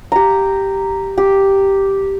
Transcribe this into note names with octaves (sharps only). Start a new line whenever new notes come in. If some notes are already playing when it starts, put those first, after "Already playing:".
G4 A#5
G4